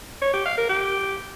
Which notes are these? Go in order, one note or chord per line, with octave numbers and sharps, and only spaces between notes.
C#5
G4
F5
A#4
G4